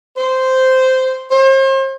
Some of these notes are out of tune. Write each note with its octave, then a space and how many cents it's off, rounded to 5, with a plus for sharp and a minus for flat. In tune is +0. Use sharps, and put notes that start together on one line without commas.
C5 -10
C5 +40